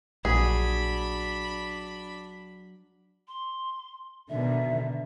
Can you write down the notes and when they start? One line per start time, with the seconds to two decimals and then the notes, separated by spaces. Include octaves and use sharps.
0.25 A#1 A#2 F#3 D4 G#4 B5
3.28 C6
4.29 B2 D3 D#3 E5